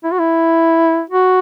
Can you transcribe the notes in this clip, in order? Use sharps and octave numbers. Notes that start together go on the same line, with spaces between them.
E4
F#4
E4
F#4